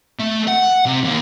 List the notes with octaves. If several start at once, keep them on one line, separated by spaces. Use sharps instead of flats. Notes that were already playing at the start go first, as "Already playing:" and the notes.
A3
F#5
C3
D#2